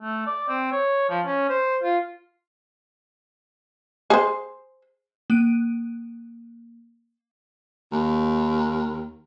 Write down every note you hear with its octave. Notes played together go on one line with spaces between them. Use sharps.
A3
D5
C4
C#5
F3
C#4
C5
F4
G#4 C5
A#3 F#6 D7 D#7
D#2